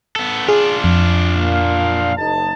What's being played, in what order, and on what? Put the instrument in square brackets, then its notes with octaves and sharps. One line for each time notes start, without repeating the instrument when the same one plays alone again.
[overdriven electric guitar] B3 A4
[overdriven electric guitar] D4 F4 [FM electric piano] G#4
[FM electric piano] F2
[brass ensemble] A#2 F5
F#1 D#4 A5